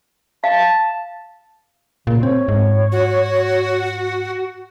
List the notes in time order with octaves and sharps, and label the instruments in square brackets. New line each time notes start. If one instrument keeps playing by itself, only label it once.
[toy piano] F5 [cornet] A5
[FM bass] A#2 [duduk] C#3
[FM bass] C4 [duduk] C#5
[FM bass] G#2
[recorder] F#4